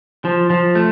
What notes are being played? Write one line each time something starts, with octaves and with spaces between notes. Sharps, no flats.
F3
F3
A3